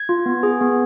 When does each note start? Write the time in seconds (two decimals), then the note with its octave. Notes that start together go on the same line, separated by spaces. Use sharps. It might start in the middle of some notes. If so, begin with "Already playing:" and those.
Already playing: G#6
0.09 F4
0.26 B3
0.43 G#4
0.61 B3